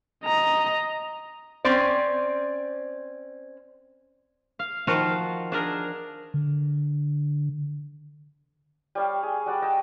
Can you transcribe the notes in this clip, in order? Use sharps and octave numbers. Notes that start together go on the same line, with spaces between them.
D#5 A#5
C4 C#4 C5 D5
F5
D#3 F3 F4 F#4 F5
D4 G#4 A#4
D3
G3 C#5 F5
G#4
G3 F#4 D5
D#5 G5 A5